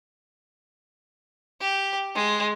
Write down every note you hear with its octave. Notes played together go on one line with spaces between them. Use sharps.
G4
G#3